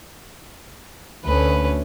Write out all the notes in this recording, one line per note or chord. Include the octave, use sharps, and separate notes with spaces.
D2 C#4 B4